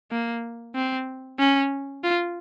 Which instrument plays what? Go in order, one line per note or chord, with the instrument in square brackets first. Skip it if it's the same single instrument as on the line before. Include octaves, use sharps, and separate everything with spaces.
[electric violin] A#3
C4
C#4
F4